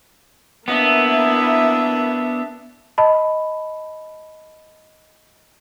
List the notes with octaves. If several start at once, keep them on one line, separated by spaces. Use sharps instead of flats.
A#3 B3 D4 E4 E5
D#5 A5 B5